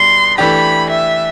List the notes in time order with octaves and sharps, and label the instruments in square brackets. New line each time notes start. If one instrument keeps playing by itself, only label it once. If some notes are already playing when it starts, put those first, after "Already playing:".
Already playing: [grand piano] B2 G3 D4 [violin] C6
[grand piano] E3 A3 D4 G4 [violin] B5
[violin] E5